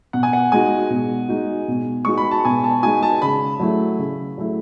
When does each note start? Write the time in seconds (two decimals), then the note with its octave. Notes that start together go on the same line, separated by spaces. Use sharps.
0.13 B2 F#5
0.23 G#5
0.33 F#5
0.52 G#3 D#4 F#4 G#5
0.90 B2
1.29 G#3 D#4 F#4
1.68 B2
2.05 G#3 D#4 F#4 C#6
2.18 B5
2.31 A5
2.45 B2 G#5
2.64 A5
2.83 G#3 D#4 F#4 G#5
3.03 A5
3.22 C#3 B5
3.60 F#3 A3 E4
3.99 C#3
4.38 F#3 A3 E4